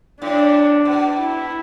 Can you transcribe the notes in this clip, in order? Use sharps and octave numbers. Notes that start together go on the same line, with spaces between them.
A2 D4
B2
E4